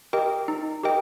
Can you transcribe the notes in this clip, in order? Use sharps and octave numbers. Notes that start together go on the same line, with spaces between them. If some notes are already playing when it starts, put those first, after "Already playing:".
G4 A#4 D#5 G5
D#4
G4 A#4 D#5 G5